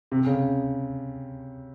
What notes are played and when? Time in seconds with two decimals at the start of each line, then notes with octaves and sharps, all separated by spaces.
0.12 C3
0.26 C#3